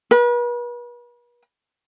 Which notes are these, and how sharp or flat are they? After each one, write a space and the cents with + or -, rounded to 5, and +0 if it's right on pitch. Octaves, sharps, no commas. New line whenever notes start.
B4 -40